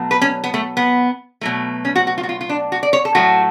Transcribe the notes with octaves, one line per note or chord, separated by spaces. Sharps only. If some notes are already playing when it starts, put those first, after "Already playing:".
Already playing: B2 F#3 A3
B4
C#4
B3
A3
B3
B2 F#3 A3
C#4
F#4
F#4
F4
F#4
F4
F4
D4
F#4
D5
C#5
A4
A2 F#3 A3 F#4